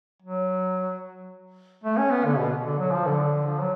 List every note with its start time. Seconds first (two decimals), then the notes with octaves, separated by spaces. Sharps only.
0.22 F#3
1.84 A3
1.98 C#4
2.11 B3
2.25 D3
2.38 B2
2.65 D3
2.79 F#3
2.92 F3
3.06 D3
3.47 F3
3.60 F#3